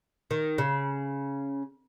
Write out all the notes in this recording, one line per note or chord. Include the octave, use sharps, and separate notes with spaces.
D#3
C#3